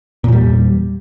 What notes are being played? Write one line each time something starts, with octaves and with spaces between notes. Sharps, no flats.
E2 A#2 G3